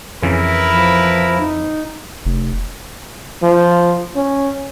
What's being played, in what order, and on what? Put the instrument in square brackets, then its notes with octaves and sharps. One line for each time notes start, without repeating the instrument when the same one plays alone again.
[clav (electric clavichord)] F2 C#3 E3 [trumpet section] E4 A#4 B4
[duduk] F3
D#4
[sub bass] F1
[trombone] F3
C#4